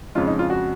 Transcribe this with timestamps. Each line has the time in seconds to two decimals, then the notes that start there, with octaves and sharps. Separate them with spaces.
0.15 F2 C#3 G#3 F4
0.27 D#4
0.39 F4
0.50 F#4